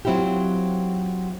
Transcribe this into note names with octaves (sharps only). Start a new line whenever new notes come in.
F#3 C4 E4 F4 G4